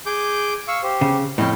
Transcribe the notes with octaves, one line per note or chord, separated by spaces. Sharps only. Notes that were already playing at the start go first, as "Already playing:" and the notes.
G#4 D6 G6
F5 C#6 E6
G4 C5
C#3
F2 A2 C#4 D#5 G5